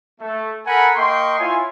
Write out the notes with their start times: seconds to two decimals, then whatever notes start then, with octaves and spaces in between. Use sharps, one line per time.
0.20 A3
0.66 A4 A#4 F#5 G#5 A#5 B5
0.97 A#3 D#5 G5 C6 C#6
1.39 E4 F4 C#5 G#5